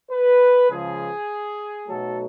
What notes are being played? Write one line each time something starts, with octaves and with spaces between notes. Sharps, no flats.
B4
C#2 C#3 F3 G#4
B1 B2 F#3 A3 A4